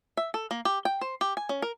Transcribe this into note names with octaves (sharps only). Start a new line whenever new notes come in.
E5
A4
A#3
G4
G5
C5
G4
G#5
C#4
A#4